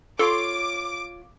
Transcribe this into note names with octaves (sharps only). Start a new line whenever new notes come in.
F4 A4 C#5 C6 D6